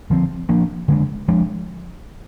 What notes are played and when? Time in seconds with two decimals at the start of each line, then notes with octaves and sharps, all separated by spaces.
0.10 D3 F3 C4
0.49 F3 A#3 D4
0.88 D3 G#3 D4
1.28 F3 G#3 D4